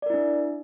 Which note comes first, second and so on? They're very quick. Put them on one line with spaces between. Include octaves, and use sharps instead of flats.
D5 A#4 E4 D4